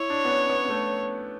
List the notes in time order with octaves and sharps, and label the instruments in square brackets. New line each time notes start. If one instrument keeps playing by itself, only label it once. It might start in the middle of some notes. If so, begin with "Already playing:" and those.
Already playing: [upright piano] E4 [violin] C#5
[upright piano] D4
B3
C#4
B3
B3
A3